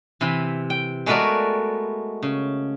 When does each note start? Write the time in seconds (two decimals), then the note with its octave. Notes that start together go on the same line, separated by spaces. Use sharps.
0.21 C3 E3 B5
0.70 G5
1.06 G#3 A3 B3 F#4 A#4 D5
2.23 C#3